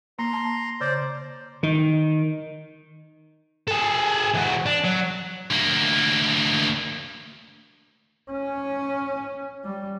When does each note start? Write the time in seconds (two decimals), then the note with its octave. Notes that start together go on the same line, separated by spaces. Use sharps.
0.19 A#3 A#5 C6
0.33 A5
0.81 C#3 C5 D5
1.63 D#3
3.68 G#4 A4
4.34 E3 F#4
4.66 D4
4.84 F#3
5.50 D2 A#3
8.31 C#4
9.64 G3